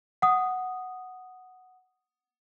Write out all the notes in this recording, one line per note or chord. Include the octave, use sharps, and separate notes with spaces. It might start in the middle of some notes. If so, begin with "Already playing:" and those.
F#5 D#6